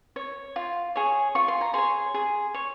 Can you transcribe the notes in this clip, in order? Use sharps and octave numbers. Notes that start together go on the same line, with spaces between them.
C#5
F4
G#4 C#5
F4 C#6
C6
A#5
G#4 C#5 C6
G#4
C#5